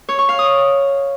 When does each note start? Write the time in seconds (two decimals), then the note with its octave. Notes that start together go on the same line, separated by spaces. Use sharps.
0.09 C#5
0.19 C#6
0.29 F5
0.39 D#6